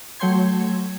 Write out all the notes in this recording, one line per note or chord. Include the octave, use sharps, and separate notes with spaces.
F#3 A3 C#5 G5 C6 G#6